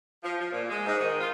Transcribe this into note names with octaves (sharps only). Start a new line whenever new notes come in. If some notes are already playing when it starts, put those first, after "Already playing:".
F3
F3
A#2
G#3
G#2
D#3
F4